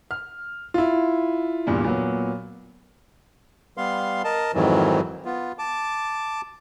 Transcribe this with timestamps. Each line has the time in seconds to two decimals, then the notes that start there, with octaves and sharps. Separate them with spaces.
0.11 F6
0.74 E4 F4
1.67 E2 G2 A#2 G3
1.84 A#2 F#3 B3
3.77 G3 B3 F5 C6
4.24 A#4 D#5 A5
4.54 F2 G#2 D#3 E3 F#3
5.25 B3 F4
5.59 A5 D6